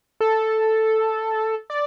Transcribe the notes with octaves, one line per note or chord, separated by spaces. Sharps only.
A4
D5